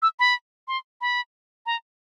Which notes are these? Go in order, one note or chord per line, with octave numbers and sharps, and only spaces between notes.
E6
B5
C6
B5
A#5